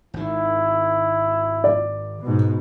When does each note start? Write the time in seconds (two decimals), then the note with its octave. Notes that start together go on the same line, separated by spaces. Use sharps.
0.14 G#1 D#3 E4
1.64 D5
2.22 G#2 B2